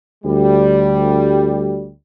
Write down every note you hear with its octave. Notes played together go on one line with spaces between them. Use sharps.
D2 G3